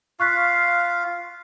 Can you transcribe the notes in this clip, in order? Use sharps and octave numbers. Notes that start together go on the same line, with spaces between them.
F4 F5 C#6 F#6 B6